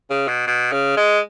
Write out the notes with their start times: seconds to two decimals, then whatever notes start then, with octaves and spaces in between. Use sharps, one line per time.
0.10 C#3
0.28 B2
0.47 B2
0.72 C#3
0.97 G#3